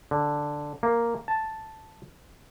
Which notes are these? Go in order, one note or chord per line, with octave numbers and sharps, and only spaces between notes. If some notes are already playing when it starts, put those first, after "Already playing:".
D3
A#3
A5